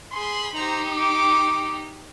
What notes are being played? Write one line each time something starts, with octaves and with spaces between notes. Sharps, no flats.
G#4 B5 C6
D#4 G4 C5 A#5
D6